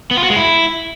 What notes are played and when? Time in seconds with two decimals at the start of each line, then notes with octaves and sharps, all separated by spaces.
0.11 B3
0.17 F4
0.24 F#4
0.30 G#3
0.36 E4